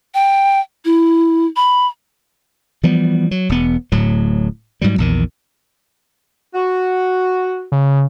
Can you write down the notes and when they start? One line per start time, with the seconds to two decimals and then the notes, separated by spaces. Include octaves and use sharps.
0.14 G5
0.85 E4
1.56 B5
2.83 E3 F3 G3 B3
3.31 F#3
3.49 E1 B3
3.92 D1 A2 F#3
4.81 G#2 F#3 G3
4.98 A#1 E2 D#3
6.54 F#4
7.72 C#3